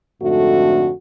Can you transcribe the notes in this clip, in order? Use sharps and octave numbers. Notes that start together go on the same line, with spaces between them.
F2 G#2 D3 A3 F#4